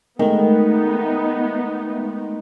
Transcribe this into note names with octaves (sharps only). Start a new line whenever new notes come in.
D#3 G#3 A3 B3 D#4